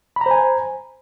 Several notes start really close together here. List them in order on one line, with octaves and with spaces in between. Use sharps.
B5 A#5 C5 G#5